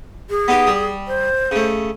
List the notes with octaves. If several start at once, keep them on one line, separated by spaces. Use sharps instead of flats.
G#4
B3 D#4 G4
G3 D#6
C5
C#3 A3